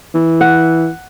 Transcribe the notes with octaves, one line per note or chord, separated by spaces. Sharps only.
E3
F#5